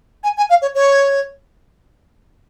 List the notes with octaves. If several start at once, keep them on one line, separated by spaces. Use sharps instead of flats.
G#5
G#5
F5
C#5
C#5